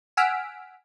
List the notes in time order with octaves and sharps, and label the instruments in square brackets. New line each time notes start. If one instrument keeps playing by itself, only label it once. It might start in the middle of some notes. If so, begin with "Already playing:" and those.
[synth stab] F#5 G#5 E6 F6 B6 D7